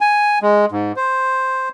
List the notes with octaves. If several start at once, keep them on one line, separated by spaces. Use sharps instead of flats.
G#5
G#3
G#2
C5